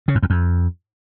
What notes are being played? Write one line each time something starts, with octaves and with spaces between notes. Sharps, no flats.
C#3
G#2
E2
F2